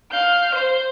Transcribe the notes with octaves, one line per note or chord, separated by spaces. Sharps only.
F5 G6
C5